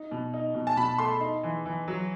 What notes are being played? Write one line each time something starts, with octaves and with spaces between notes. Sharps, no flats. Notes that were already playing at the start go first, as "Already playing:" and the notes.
Already playing: D#4
B2
D#4
B2
A5
B2 B5
A3 C6
D#4
E3
E3
F#3